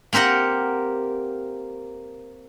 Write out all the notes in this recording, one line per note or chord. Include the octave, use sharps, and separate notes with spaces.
A#3 C4 G4 A#4 F#5